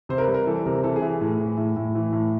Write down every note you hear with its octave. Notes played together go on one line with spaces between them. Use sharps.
C3 C5
A#4
B4
G3
A#4
E3 A4
C3 A#4
E3 A4
G#4
E3
G#4
A2
E3
A2
A2
E3
A2